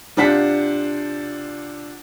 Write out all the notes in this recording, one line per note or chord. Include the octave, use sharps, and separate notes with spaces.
C3 D4 F4 C5 F#5 B6